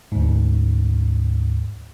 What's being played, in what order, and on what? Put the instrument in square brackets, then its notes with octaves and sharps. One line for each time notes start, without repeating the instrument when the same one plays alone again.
[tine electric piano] D2 G#2